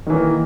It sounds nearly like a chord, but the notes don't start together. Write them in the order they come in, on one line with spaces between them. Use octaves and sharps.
D#3 E3 A#3